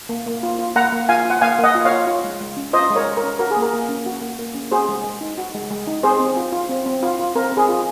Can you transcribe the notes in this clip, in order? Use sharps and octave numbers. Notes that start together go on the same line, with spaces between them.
A#3
A#3
F4
F4
A#3 F#5 A#5
A#3
F4 F5 G#5
F4
F#5
A#3 F5 G#5
A#3
D#5 F#5
F4
C#5 F5
F4
F4
G#3
G#3
C#4
F4 C5 D#5
G#3
A#4 C#5
G#3
A#4
C#4
F#4 A#4
G#4
A#3
A#4
A#3
C#4
F#4
A#3
A#3
C#4
F#4 G#4 C5
G#3
G#3
D#4
F#4
G#3
G#3
D#4
C4 G#4 C5
C4
F4
F4
C4
C4
F4
F4
C4 A#4
C4 G#4
F4